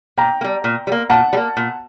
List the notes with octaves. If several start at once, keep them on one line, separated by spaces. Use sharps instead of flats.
A#2 G5 A#5
A#3
G3
A#2
G3
A#3
A#2 F#5 A5
G3
A#3
A#2